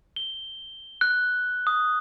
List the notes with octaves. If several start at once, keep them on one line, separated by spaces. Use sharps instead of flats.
G7
F#6
D#6